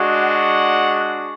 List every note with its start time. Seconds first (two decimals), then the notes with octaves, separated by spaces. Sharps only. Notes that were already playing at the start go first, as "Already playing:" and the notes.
Already playing: G#3 D4 F#4
0.24 F#5